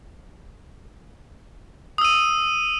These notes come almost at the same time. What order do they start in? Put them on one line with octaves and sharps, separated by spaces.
D#6 E6 D#7